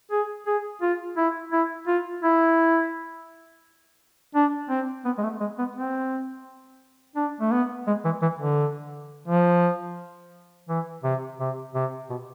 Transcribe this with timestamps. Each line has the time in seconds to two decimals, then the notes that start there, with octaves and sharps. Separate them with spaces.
0.11 G#4
0.47 G#4
0.82 F4
1.17 E4
1.52 E4
1.87 F4
2.23 E4
4.35 D4
4.69 C4
5.05 B3
5.18 G#3
5.23 A3
5.40 G#3
5.58 B3
5.76 C4
7.16 D4
7.40 A3
7.52 B3
7.87 G#3
8.05 E3
8.22 E3
8.39 D3
9.28 F3
10.69 E3
11.04 C3
11.40 C3
11.75 C3
12.10 B2